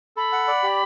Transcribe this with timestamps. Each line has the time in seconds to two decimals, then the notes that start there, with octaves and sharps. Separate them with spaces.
0.16 A4 B5
0.32 F#5
0.47 D5
0.63 G4